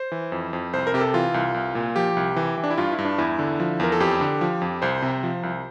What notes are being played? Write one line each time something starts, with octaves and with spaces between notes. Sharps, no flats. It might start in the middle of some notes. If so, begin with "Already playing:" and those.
Already playing: C5
E3
F2
F2
C2 C5
A#4
C3 G4
A4
E3 F4
C2
C2
A#2
F3 G4
C2
E3
E3
D4
E4
G2 F4
E4
G2
D4
E2 E4
D3
F3
E2 A#4
A4
F2 G4
D3
F3
F2
C2 C5
C3
F3
C2